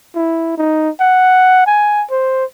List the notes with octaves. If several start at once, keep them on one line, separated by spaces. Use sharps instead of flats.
E4
D#4
F#5
G#5
C5